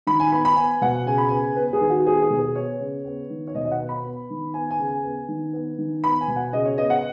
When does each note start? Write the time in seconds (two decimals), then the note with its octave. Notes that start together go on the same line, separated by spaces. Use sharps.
0.07 D#3 B5
0.20 G#5
0.32 B3 B5
0.45 B5
0.56 B3 G#5
0.81 B2 F#5
1.06 C#3 G#5
1.18 B5
1.29 B3 G#5
1.56 B3 B4
1.69 B4
1.73 G#4
1.81 D#3
1.90 F#4
2.06 B3 G#4
2.22 G#4
2.30 B2
2.39 G#4
2.56 B3 C#5
2.81 C#3
3.05 B3
3.30 D#3
3.47 C#5
3.55 B2 D#5
3.65 D#5
3.71 F#5
3.80 B3
3.89 B5
4.05 B3
4.30 D#3
4.54 B3 G#5
4.71 G#5
4.79 C#3
4.88 G#5
5.04 B3
5.29 D#3
5.53 B3
5.78 D#3
6.04 B3 B5
6.21 G#5
6.28 B2
6.36 F#5
6.53 C#3 D#5
6.65 C#5
6.78 B3 D#5
6.90 F#5